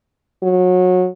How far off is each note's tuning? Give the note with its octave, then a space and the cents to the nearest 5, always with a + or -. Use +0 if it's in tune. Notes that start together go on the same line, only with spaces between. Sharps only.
F#3 -25